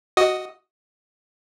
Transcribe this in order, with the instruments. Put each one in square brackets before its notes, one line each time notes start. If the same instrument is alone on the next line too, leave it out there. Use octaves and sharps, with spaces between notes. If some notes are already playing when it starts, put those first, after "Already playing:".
[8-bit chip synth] F#4 D#5 D#6